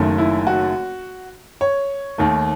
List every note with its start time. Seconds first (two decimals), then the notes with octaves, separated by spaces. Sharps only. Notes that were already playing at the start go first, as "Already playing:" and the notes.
Already playing: F#1 F#2 D#3 A3
0.18 E4
0.47 F#4
1.61 C#5
2.18 D#2 D#3 A3